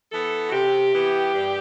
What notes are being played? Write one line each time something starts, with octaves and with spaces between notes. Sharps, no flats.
E3 B3 A4
F#4
C3 G4
E3 B3
G2